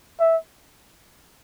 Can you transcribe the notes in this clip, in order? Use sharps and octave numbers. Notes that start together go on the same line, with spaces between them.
E5